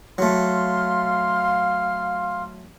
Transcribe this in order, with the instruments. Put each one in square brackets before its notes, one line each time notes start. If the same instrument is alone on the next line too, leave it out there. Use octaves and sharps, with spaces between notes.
[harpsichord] F#3 A3 [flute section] F5 C6 F6